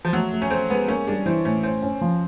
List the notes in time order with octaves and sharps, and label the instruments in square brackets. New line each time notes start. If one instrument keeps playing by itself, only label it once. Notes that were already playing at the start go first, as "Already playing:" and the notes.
[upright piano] F3
[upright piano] F#3 [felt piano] A3
[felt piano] A3
[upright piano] C#4
[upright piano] C4 [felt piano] A4
[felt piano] G#3 [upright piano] B3
[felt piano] A#3 [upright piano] C#4
[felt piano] G3 [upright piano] D4
[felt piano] E3 [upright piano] C4
[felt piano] A2 [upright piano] C#4
[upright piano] C4 [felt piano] C#4
[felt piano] C#4
F3